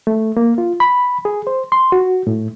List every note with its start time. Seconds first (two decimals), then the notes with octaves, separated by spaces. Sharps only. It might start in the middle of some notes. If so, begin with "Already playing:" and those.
0.07 A3
0.37 A#3
0.58 F4
0.80 B5
1.25 G#4
1.47 C5
1.72 C6
1.92 F#4
2.27 A2